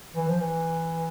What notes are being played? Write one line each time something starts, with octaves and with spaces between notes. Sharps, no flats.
E3
F3
E3